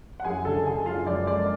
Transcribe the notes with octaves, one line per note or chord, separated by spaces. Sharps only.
F#5
F#2 G#4 G#5
D3 A4 A5
D3 G#4 G#5
F#2 F4 F5
F#2 D5
G#3 D5